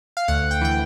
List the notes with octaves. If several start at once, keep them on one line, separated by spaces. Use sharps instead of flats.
F5
D2 F#5
G5
E3 G5